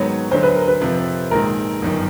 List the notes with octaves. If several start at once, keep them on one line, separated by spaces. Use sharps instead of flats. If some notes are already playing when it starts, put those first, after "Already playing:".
Already playing: G#2 D#3 F#3 B3 C#5
D2 D3 F#3 C5
B4
A#4
B4
F2 C3 F3
A#1 G#2 D#3 A#4
G1 F#2 D#3